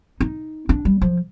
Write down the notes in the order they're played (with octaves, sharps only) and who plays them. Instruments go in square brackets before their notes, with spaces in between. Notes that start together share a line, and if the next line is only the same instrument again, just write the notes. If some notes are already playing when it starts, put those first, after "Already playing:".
[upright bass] D#4
D4
G3
F3